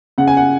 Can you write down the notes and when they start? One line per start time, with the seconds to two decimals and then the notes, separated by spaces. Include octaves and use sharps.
0.18 C#3 F#5
0.28 G#5
0.37 F#5